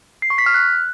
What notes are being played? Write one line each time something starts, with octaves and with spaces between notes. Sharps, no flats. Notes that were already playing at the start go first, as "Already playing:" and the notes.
C7
C#6
B6
F6
F#6